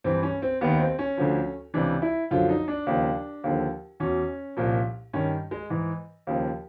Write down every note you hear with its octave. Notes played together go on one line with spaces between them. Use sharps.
G2 E3 C4
C#4
C4
D#2 D#3 B3
C4
C#4
D2 D3 F3
C#2 C3 E3 D4
E4
F#2 D3 F3 F4
D#4
D4
D#2 C#3 F3
D#2 D3 F3
E2 B2 C#4
C2 A#2 F3
G2 D#3 C#4
G#3
G#2 E3
D#2 C#3 F3